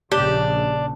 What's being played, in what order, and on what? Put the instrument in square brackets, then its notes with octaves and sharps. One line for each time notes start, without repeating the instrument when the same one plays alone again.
[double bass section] A#1 C#3 [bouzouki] D4 [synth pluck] G4